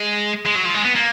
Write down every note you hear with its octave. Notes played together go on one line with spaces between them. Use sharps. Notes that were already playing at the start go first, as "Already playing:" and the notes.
Already playing: G#3
G#3
F#3
F3
G#3
B3
A#3